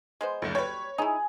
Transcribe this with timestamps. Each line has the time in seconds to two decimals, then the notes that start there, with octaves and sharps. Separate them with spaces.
0.21 G#3 B3 C5
0.42 F#1 D2
0.55 G3 B4 C#5
0.98 D#4 E4 G#4